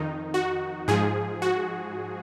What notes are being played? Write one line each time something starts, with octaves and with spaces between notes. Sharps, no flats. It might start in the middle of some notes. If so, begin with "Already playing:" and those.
Already playing: F2 D#3 D#4
F#4
G#2 F3 G#4
F#4